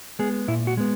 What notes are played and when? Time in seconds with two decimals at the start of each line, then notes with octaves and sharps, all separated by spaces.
0.19 G#3 B3 G#4
0.48 A#2 E4
0.67 F#4
0.77 G#3 B3